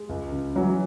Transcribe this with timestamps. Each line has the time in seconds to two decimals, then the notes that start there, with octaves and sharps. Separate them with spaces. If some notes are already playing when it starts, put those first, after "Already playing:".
Already playing: G#3
0.09 C#2
0.32 C#3
0.55 E3 F#3